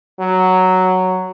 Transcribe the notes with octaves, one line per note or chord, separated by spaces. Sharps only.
F#3